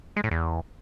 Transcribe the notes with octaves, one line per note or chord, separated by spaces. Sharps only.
G#3
A2
E2